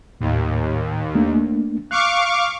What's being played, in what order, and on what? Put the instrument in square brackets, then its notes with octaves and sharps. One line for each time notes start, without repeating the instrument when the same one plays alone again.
[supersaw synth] D#2 [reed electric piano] A2
[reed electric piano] A3 A#3 D4
[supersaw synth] F5 C#6 D6 [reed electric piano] F#6